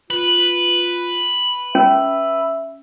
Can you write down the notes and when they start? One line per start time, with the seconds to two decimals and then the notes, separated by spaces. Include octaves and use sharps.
0.10 F4 B4
1.75 C#4 E5